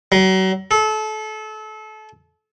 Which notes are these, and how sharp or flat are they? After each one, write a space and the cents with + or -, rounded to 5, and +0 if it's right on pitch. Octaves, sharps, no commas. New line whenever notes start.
F#3 +35
A4 -30